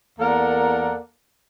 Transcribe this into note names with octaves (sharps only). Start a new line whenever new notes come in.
E2 A#3 A4 A#4 D5 F#5